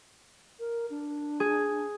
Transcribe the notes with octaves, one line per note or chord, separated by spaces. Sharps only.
A#4
D4
G#4